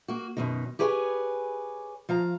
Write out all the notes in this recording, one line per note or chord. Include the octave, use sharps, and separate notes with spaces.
A#3 F#4
F#2 B2 D#3
G4 G#4 B4 C#5 F#5 G#5
F3 F5 A#5